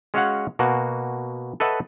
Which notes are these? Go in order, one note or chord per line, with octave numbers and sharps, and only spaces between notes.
G#3 C#4 F#4 C#5 F5 F#5
B2 A#3 F#4
A4 B4 C#5 D#5 E5 F#5